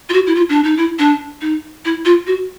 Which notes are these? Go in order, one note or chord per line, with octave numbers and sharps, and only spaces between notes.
F4
F#4
E4
F4
D4
D#4
E4
D4
D#4
E4
F4
F#4